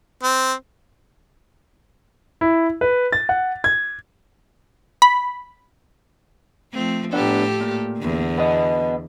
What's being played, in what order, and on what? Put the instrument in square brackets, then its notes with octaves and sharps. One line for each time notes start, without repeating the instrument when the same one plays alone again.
[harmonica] C4
[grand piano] E4
B4
A6
F#5
G#6
[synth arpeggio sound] B5
[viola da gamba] F3 A3 C4
[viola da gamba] A2 G4 A4 [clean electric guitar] B3 D4
[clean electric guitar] A#2
[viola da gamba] E2 D3
[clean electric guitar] B3 D#5